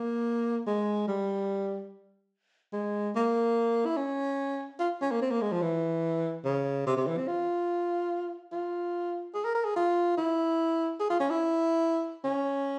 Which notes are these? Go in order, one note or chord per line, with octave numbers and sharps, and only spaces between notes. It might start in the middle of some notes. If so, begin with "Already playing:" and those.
Already playing: A#3
G#3
G3
G#3
A#3
E4
C#4
F4
C#4
A#3
C4
A#3
G#3
F3
E3
C#3
C3
C3
E3
C4
F4
F4
G#4
A#4
A#4
G#4
F4
E4
G#4
F4
C#4
E4
C#4